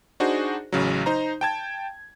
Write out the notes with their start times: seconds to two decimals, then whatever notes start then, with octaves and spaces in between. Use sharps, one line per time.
0.20 D4 D#4 F#4 G#4 C5
0.72 A1 C#3 F#3
1.06 D#4 C5 A#5
1.41 G5 A5 G#6